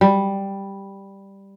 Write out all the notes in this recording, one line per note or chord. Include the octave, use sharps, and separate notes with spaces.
G3